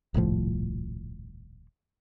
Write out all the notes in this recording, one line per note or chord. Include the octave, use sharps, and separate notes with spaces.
D#1 C2 A2 F3